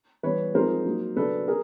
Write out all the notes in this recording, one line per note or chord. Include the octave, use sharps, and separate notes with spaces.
E3 G3 B3 B4 C#5
F3 G#3 C4 D#4 A#4 C5
F#3 A#3 D#4
C#3 F#3 B3 D4 A4 B4
G#4 A#4